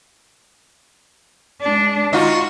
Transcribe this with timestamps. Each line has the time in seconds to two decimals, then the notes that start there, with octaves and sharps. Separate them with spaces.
1.61 G#3 D4
2.13 D#4 F4 F#4